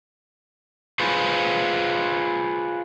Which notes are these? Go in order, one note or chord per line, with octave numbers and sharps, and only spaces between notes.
F4 G#4 B4 C5